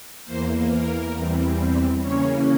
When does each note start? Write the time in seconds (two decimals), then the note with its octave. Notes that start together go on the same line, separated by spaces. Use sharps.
0.24 E2 E3 A#3 C5
0.68 A#4
1.13 E2 E3 G3 C4
2.01 C#3 E3 A#3 C#4 C#5